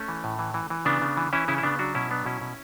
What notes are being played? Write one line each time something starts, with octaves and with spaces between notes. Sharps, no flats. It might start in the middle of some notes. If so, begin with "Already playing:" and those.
Already playing: A3 C#4
E3
A2
E3
E3
E3
C#3 B3 D4
C#3
E3
E3 C#4 E4
C#3 C#4 E4
E4
C#3 B3 D4
F#3 D4 F#4
B2 C#4 E4
F#3 B3 D4
B2 C#4 E4
B2